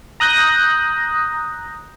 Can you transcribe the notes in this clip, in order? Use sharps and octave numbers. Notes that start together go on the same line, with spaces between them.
A#5 D#6 F#6 G6 A#6